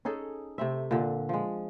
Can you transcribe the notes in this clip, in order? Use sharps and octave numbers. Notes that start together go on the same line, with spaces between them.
C#4 D#4 G#4 A4
C3 A3 C4 E5
A#2 D3 D4
F3 G#3